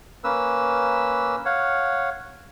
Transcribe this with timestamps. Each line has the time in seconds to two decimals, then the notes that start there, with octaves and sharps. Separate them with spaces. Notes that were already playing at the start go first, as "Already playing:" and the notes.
0.24 A#3 C#4 B4 E6
1.45 C#5 F5 F#5